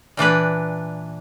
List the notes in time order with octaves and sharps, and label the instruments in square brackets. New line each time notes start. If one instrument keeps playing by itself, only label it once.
[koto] A#2 E3 D4 B4